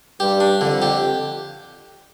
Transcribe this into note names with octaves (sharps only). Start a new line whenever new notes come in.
G2 G4
D4
F2 D3
G4